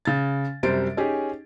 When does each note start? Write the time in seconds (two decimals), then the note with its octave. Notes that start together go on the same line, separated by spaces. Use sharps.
0.05 C#3 A6
0.63 F#2 C3 G3 C5 A6 D7
0.97 C#4 D#4 G4 G#4